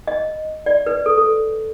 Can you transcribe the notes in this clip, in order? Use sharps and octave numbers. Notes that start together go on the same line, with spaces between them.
D#5
D5
B4
A4
A4